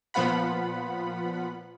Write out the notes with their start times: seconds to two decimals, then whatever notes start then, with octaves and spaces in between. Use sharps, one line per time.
0.14 A#2 F3 B3 F4 F#5 B5